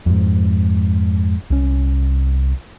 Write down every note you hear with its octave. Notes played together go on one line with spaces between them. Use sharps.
F2 G#2
C2 C#4